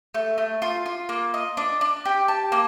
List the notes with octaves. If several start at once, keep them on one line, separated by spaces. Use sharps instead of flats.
A3
A3
F4
F4
A#3
D#5
D4
D4
G4
A5
A#3